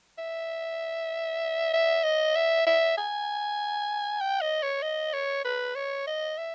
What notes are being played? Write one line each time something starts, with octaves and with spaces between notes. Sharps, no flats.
E5
E5
D#5
E5
E5
G#5
G5
D#5
C#5
D#5
C#5
B4
C#5
D#5
E5